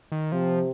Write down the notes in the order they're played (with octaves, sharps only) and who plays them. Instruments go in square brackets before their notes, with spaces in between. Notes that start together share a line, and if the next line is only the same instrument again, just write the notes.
[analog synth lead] D#3
[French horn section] C3 [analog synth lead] F3